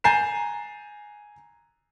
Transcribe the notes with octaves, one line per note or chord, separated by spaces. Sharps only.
G#5 A#5 G6 A6 C7 E7